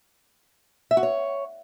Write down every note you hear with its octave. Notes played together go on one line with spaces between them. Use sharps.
E5
F#4
C#5